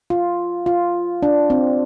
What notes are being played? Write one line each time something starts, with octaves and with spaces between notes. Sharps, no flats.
F4
F4
D4
C4